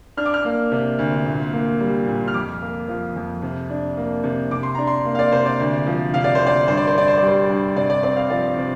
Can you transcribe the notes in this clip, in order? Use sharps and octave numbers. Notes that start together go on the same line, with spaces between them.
D4 F6
D6
F6
A#3
C3
D2
A#2
A#3
G3
A#2
F6
F2 D6
A#3
F3
F2
C3
D4
A#3
C3
C3 D6
C6
D4 A#5
C6
A#3
F5
D5
C3 C5
D5
D2
F3
C3 F5
D5
C5
D2
D5
G2 C5
D5
C5
D4 D5
C5
G3 D5
C5
G2
C3 D5
D5
C4 D5
F5
F3 D5
C3